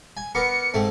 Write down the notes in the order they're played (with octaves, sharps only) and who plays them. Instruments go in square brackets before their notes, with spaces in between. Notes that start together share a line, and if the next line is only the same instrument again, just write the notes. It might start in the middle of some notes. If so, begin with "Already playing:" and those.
[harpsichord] G#5
[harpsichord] B3 A#4 D6 [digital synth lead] C#7
[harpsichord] G#2 A3 C4